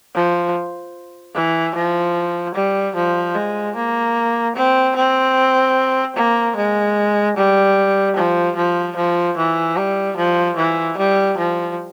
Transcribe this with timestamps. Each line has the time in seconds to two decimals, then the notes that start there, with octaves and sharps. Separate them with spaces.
0.15 F3
1.35 E3
1.75 F3
2.55 G3
2.96 F3
3.35 G#3
3.76 A#3
4.56 C4
4.96 C4
6.16 A#3
6.56 G#3
7.36 G3
8.16 F3
8.56 F3
8.96 F3
9.37 E3
9.77 G3
10.17 F3
10.57 E3
10.97 G3
11.38 F3